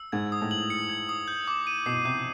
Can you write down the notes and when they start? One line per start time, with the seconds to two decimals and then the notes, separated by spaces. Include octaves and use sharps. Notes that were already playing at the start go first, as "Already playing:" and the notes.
Already playing: E6
0.12 G#2 G#6
0.32 D#6
0.41 A2
0.51 F#7
0.70 C#7
0.90 G#6
1.09 D#6
1.28 G6
1.48 D6
1.67 D#7
1.86 B2 C7
2.05 C3 G6